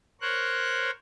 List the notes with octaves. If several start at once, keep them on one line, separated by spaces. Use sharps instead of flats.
A#4 C5 C#5 F#6